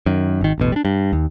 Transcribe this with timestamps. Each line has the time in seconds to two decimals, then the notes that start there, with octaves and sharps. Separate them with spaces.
0.06 F#2 D#3
0.41 G#1 D#3
0.58 E1 A1 B2
0.72 G3 D4
0.85 G2
1.13 D#2